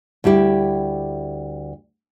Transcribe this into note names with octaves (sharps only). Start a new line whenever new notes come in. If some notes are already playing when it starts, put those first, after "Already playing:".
D2 G3 E4 G4